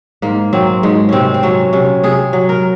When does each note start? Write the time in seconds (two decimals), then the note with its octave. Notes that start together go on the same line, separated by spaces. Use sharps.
0.22 G#2 A#3
0.53 F#3 C4
0.83 G#2 G#3
1.09 C3 C4 C#4
1.34 C4
1.43 F#3 C#4
1.73 C3 C#4
2.03 C3 G#4
2.33 F#3
2.49 A#4